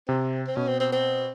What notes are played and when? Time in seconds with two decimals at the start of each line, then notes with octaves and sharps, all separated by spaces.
0.08 C3 C4
0.47 C4
0.56 B2 C#4
0.68 C4
0.80 C4
0.92 C4